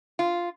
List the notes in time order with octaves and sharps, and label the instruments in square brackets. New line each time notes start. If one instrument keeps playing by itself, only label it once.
[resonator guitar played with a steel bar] F4